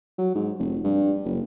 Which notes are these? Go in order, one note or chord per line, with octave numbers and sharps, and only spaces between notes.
F#3
G#2
F1
G2
F#1